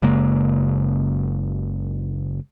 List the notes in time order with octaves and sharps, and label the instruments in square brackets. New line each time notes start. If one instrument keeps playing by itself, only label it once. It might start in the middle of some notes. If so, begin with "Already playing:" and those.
[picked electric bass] F#1 C#3 G#3 A#3